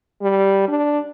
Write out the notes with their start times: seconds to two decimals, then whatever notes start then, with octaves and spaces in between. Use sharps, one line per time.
0.22 G3
0.68 D4